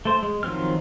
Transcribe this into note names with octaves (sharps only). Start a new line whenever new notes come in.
A3 C5
G#3
D#3 F3 F#3 C4 F6